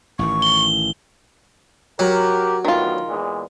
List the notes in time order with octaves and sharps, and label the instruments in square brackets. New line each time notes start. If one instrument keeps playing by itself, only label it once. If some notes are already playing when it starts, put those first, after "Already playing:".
[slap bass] A1 A2 D#3 [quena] C#6
[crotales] G7
[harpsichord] F#3 [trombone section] G4 A#4
[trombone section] D2 A2 B3 [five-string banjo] D#3 F4
[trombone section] E2 A#2 G#3